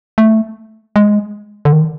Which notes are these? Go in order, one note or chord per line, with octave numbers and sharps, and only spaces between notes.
A3
G#3
D3
D#3